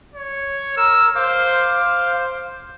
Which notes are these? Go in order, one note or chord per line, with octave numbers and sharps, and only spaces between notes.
C#5
A#4 E6
C5 F5 D6
C5